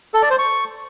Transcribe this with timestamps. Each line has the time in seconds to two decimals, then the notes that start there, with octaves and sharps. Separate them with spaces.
0.14 A4
0.22 D5
0.30 C5
0.39 C#6